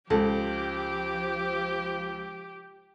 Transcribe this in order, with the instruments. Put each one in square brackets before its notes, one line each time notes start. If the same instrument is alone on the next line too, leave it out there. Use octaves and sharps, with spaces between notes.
[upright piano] C#2 [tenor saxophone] F3 [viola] G4 [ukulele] A4